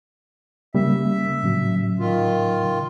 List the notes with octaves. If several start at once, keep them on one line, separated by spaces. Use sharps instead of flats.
C#3 G3 A#3 E5
A2 C#3 F#3
D#3 F4